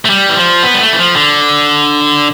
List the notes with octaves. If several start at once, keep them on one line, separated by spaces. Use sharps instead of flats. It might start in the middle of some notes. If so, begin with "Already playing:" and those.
A3
G3
E3
F3
B3
G3
A3
E3
F3
D3